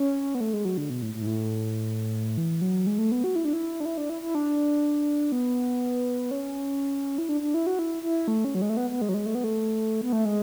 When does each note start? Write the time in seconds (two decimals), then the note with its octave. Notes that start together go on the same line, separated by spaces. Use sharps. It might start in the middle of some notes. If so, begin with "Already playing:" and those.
Already playing: C#4
0.35 B3
0.40 A3
0.53 G#3
0.65 F#3
0.77 D3
0.90 B2
1.02 A2
1.14 A2
1.22 G#2
1.26 A2
2.37 E3
2.61 F#3
2.87 G#3
2.98 A3
3.12 B3
3.24 F#4
3.35 E4
3.45 D4
3.53 E4
3.80 D4
3.85 E4
3.98 D4
4.09 E4
4.22 E4
4.35 D4
5.32 B3
6.31 C#4
7.18 E4
7.29 D4
7.41 D4
7.54 E4
7.67 F#4
7.79 E4
8.03 E4
8.28 A3
8.44 C#4
8.55 F#3
8.62 G#3
8.70 A3
8.77 B3
8.90 B3
9.01 G#3
9.09 F#3
9.14 G#3
9.26 A3
9.35 B3
9.44 A3
10.01 B3
10.13 A3
10.25 G#3